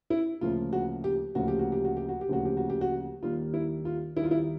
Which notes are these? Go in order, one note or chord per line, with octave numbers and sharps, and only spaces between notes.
E4
D2 C#3 F3 A#3 F4
F#4
G4
D2 C#3 F3 A#3 F#4
G4
F#4
G4
F#4
G4
F#4
G4
D2 C#3 F3 A#3 F#4
G4
F#4
G4
F#4
D#2 D#3 G3 A#3 F4
E4
F4
D#2 D#3 G3 A#3 E4
F4
E4